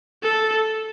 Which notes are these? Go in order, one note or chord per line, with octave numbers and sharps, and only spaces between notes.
A4